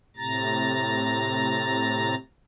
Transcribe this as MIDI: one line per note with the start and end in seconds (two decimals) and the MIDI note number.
0.17 2.15 45
0.17 2.15 48
0.17 2.15 82
0.17 2.15 93